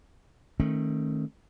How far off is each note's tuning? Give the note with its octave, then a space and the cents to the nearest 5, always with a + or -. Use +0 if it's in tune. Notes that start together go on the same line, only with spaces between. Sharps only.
D#3 +5 A3 +0 C#4 -40